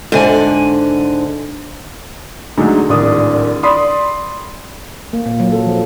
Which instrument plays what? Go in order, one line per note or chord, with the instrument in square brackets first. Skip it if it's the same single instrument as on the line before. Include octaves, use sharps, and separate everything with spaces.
[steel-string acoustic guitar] G#2 D3 G#5
[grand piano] D3 F#3 G#3 A3 D#4
D1 G#1 D4 D#6
D5 B5 C6 D#6
[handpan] A#3
A#2
F#3
A4
F3